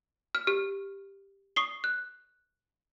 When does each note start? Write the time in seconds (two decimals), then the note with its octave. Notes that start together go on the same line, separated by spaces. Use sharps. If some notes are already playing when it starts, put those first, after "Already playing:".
0.35 F6
0.47 G4 F6
1.56 C#6 D#6 C7 G7
1.84 F#6